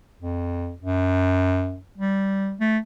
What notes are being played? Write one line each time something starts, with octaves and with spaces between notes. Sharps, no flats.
F2
F#2
G3
A3